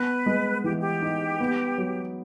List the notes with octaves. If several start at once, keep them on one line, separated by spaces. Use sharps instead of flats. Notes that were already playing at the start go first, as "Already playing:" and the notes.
Already playing: B3 B4
G#3
E3 G4
G4
D#4
B3
F#3